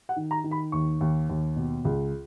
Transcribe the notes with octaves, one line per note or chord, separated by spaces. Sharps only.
F#5
D#3
A#5
D#3
B5
D#2 C#6
D#2
D#2
B2
C#2